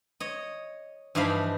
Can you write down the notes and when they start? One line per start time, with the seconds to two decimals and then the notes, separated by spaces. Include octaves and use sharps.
0.20 C#5 D#5
1.15 G2 E3 F3 D#4 F5 B5